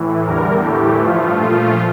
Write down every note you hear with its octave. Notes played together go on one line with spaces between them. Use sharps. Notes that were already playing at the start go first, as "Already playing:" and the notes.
Already playing: A2 E3
E2 D3 G3 A#4
A2 E3 A3 G4
G2 F3 A3 F4
A#2 F3 A3